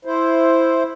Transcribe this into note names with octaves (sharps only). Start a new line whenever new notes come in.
E4 C5